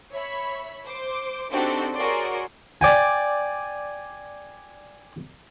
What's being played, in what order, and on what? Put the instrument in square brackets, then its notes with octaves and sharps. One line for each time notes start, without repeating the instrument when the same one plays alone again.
[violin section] C#5 E5 B5
C5 D6
C4 D4 D#4 F#4 G4 A4
F#4 G#4 A#4 C#5 D5 C6
[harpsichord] D5 G5 G#5